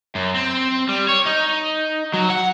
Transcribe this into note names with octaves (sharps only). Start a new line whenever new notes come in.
F#2
C4
G3
C#5
D#4
F#3
F#5